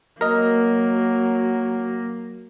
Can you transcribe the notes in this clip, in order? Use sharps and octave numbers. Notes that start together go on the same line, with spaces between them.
F#3 A#3 A#4 D#5